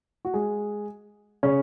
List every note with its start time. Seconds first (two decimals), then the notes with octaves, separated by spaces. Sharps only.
0.25 F#4
0.34 G#3 G#4
1.43 C#3 C#4